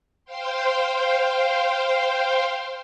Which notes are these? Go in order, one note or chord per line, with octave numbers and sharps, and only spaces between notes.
C5 F5 G5 C6